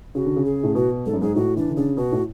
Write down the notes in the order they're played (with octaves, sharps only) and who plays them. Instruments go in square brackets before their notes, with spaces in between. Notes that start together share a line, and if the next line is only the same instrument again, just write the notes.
[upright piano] C#3 [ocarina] F#4
[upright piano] D3
C#3
[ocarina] G#4
[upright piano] A2
[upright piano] B2 [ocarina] F#4
[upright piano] G#2 [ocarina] A4
[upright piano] F#2
[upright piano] G#2 [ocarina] G#4
[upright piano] A2 [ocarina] F#4
[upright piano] E3 [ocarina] D4
[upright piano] D3
[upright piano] C#3 [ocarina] D4
[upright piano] B2 [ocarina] F#4
[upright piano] A2